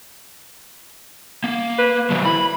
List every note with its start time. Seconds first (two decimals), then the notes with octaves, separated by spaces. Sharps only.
1.44 A#3
1.78 B4
2.10 D#3 F#3
2.25 E4 B5